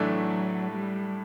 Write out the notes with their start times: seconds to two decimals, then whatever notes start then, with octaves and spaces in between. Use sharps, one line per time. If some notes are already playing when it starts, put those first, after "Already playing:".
Already playing: A2 E3 F#3 A3 D4
0.70 G3